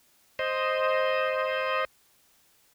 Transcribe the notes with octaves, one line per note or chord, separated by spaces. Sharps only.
C5 D#5